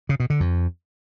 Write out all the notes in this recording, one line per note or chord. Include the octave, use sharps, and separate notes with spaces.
C#3
B2
D3
F2